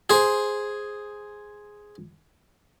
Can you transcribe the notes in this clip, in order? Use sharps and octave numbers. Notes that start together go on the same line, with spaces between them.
G#4 C5